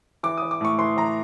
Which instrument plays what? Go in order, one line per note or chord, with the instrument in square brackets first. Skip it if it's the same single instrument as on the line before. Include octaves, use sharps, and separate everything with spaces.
[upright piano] E3 D6
E3 D#6
D6
A2 C#6
E3 C6
E3 A#5